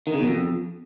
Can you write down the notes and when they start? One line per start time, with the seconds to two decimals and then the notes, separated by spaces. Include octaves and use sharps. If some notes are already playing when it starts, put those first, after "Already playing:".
0.07 D#3
0.13 C#3
0.20 B2
0.27 F2